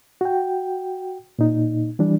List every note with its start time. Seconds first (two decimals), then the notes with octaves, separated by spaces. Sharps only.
0.21 F#4 G5
1.39 A#2 D#4
1.99 E3 G3 D4